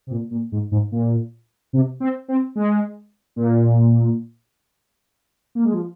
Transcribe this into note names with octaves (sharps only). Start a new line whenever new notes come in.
C3
A#2
A#2
G#2
G#2
A#2
C3
C4
C4
G#3
A#2
A#3
G#3
F3